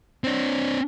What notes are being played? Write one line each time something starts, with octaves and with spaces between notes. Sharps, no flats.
C4 D4